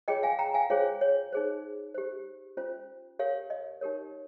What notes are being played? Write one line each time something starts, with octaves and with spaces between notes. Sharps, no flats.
F4 G#4 C#5 D#5 G5
F5 G#5
G5 A#5
F5 G#5
F4 G#4 C5 C#5 F5
C#5
D#4 G#4 C5
G4 C5
C#4 F4 C5
G4 A#4 C#5 F5
D#5
D#4 G4 A#4 C#5